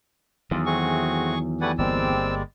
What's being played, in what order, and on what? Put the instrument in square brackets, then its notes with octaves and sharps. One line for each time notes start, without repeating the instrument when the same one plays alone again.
[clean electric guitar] E2 [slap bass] D#3 F#3 [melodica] F4
[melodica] A3 C4 F#4 [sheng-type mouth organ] G#4 C#6
[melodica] G3 D5 G#5 [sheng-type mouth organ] A3 B4 F#5
[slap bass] G1 A#3 [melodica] G3 G#3 D5 [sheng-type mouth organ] C4 E6